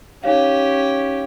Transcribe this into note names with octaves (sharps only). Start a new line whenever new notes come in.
C#4 D#4 G4 C#5 F5